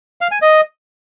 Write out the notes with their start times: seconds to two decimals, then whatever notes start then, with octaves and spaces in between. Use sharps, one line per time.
0.21 F5
0.32 G#5
0.42 D#5